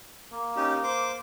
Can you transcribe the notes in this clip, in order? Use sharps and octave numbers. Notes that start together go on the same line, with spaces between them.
A#3
C#4 D#4 G4
C5 D6